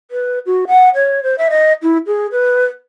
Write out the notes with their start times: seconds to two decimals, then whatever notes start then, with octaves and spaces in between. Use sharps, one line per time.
0.11 B4
0.46 F#4
0.67 F#5
0.95 C#5
1.23 C5
1.38 E5
1.50 D#5
1.83 E4
2.07 G#4
2.32 B4